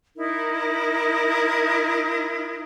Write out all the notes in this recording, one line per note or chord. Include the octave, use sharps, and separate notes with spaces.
D#4 E4 A#4